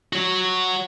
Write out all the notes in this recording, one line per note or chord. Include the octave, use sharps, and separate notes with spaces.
F#4 C#5